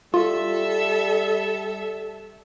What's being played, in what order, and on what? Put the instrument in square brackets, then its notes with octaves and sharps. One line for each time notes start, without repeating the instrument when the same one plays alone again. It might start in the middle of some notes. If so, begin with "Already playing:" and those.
[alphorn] G3 [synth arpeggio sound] F4 [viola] A4 E5